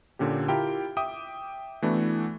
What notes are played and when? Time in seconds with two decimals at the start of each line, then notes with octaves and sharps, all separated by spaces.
0.19 A#2 D3 C#4 G4
0.48 E4 F4 G4 A#4 G5
0.97 E5 G5 D6 D#6
1.82 E3 A3 B3 D4 E4 F#4